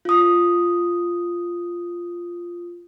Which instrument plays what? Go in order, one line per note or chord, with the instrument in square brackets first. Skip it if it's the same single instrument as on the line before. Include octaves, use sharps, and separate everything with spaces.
[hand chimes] F4 D#6